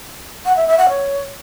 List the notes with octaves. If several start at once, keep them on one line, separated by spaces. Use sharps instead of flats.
F#5
E5
E5
F#5
C#5